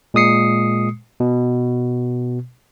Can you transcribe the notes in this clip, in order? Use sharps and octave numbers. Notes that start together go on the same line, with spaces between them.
A#2 G#3 D#6 C7 C#7
B2